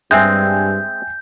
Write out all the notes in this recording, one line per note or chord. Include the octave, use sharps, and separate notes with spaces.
G2 G#3 C4 E5 G5 G#5 G6